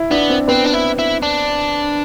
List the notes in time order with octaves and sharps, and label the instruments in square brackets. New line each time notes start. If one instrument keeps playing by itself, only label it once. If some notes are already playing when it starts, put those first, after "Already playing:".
Already playing: [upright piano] E4
[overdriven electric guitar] B3 [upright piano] D4
[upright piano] C4
[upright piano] B3 [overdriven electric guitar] C4
[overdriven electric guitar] D4
E4
E4
D4